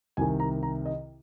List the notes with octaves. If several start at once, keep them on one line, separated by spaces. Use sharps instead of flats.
C2 C3 D#3 G#5
A#5
A#5
D#5